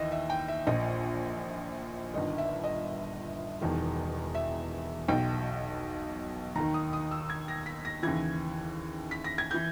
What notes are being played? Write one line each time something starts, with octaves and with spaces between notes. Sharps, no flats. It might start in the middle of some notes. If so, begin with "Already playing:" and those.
Already playing: D#2 E3 D#5 E5
E5
G5
E5
A#1 A#2 D#5
G1 G2 D#3 D#5
E5
D#5
E1 E2 D#3
E5
B1 B2 G5
D#2 D#3 A#5
D#6
D#6
E6
G#6
A#6
B6
A#6
D#2 C#3 E3 G#6
B6
A#6
G#6
E3 G6